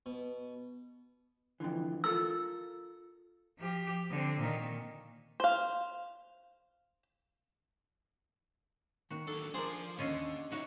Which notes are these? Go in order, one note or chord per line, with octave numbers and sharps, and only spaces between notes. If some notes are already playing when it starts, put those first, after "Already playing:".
B2
F2 D3 E3
F4 A4 A#4 E6
F3 G4
D3 C4
A#2 D#3
C5 F5
D#3 A#3 F#4
F#3 D4 A4
F3 D4 G#4 A#4 C5 D5
D#2 G#2 D3 C#4 F4 D#5
B3 D#4 F#4 C#5 D#5 E5